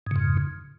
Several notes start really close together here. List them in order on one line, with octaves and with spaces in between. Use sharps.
G#2 C#3 F2